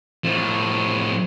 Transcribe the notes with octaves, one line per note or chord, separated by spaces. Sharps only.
A2 F3